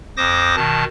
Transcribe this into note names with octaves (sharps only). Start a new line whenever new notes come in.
F2 C5 D6 D#6 A#6
B2 D#3 A5